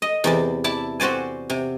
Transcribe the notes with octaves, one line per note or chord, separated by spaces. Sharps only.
D#5
E2 C3 D5
E4 D5 A5
C4 F#4 C5 D5 G#5
C3